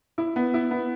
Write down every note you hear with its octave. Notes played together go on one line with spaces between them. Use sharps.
E4
B3
E4
B3